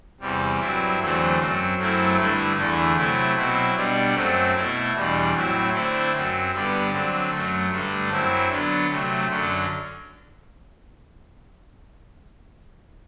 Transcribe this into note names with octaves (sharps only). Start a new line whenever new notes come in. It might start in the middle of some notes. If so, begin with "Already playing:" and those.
E2 C3 G3
G2 F#3 C4 E4
E2 D3 F#3 A3 C4
F#2 F#3 C4
F#2 F#3 A3 C4 E4
G2 D3 A3 E4
E2 D3 A3 E4
C3 F#3 A3 E4
B2 F#3 C4 E4
B2 G3 B3 D4
F#2 F#3 A3 C4
B2 A3 E4
E2 B2 G3 D4
A2 F#3 C4 E4
D3 A3 C4 E4
F#2 F#3 C4
G2 D3 G3 B3
D3 F#3 C4
F#2 F#3 A3
G2 D3 A3
F#2 F#3 C4 E4
D3 F#3 B3 D4
C3 F#3 A3
F#2 D3 F#3